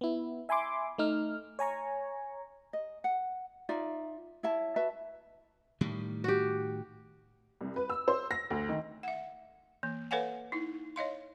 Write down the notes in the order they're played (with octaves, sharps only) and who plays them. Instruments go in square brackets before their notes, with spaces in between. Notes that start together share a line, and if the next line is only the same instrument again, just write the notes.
[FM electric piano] B3 E4
E5 G#5 B5 C6 D6
A3 D#4 F6
C#5 G#5 A#5 C#6
[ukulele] D#5
F#5
D#4 F4 D5 E5
E4 C#5 E5 A5
F#4 B4 E5 A5
[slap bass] A2 D#3 G3
[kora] F#4 G4
[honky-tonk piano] C2
B4
E6
C5
A#6
D2
D#3
[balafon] E5 F#5
E3 A#3
A4 B4 C#5 F5 F#5 G#5
D#4 E4
C#5 D#5 F5 C6